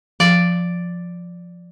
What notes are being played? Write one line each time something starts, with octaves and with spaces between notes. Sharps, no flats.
F3 D5